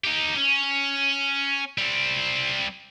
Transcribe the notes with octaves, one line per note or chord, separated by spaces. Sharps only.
D#4 G4
C#4
G3 C4